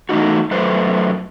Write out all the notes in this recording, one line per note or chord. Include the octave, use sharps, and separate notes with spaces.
E3 A3 D#4 F#4
F#2 A3 B4 C5